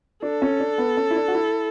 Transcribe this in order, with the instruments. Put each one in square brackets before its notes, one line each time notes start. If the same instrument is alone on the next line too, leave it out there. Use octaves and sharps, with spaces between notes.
[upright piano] D4 [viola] A4
[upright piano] C#4
D4
B3
C#4
E4
D4
F#4
E4